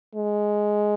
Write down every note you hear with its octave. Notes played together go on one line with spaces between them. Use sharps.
G#3